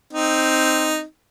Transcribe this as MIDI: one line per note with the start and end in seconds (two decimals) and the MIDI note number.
0.13 1.03 60
0.13 1.03 63